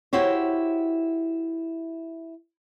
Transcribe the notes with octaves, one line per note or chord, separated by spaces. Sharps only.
E4 F#4 G4 C5 C#5